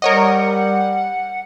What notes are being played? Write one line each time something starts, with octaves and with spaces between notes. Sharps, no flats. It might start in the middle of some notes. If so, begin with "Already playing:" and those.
G3 A#4 C#5 D#5 F#5